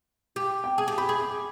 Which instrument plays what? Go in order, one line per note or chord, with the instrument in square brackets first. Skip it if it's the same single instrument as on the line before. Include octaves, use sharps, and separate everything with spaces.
[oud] G4
[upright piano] G5
[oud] G#4 [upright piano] G#5
[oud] G4
[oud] G4 [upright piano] B5
[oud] G#4
[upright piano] D6